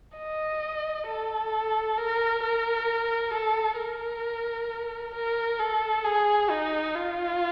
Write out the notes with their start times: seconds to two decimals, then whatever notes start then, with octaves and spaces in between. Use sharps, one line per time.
0.17 D#5
1.07 A4
1.97 A#4
2.43 A#4
3.34 A4
3.79 A#4
5.14 A#4
5.60 A4
6.05 G#4
6.50 D#4
6.96 F4